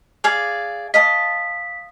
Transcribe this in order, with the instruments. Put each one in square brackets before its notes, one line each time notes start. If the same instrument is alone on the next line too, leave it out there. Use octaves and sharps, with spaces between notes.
[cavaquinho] G#4 D5 F5
[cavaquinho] D#5 F5 A5 [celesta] B6